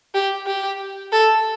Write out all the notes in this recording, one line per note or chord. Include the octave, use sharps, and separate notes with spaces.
G4
G4
A4